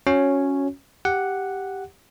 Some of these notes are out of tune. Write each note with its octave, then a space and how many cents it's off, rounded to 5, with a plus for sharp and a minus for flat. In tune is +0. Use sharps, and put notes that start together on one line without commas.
C#4 +0 F#4 -20 C#5 -5
G4 +0 F#5 +0